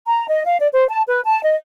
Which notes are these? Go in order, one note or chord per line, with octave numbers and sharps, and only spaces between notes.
A#5
D#5
F5
D5
C5
A5
B4
A5
D#5